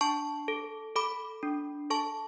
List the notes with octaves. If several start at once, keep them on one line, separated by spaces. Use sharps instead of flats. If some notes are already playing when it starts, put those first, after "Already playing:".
D4 A5 C#6
A4
A4 B5 D6
D4
A4 A5 C#6